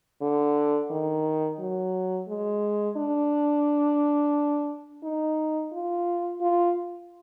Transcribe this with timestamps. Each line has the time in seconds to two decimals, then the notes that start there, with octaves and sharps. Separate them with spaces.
0.21 D3
0.91 D#3
1.59 F#3
2.28 G#3
2.97 D4
5.04 D#4
5.72 F4
6.41 F4